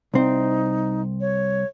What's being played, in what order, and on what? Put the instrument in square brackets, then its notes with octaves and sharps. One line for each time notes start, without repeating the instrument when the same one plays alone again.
[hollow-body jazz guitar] C2 C4 [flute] D#4
[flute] C#5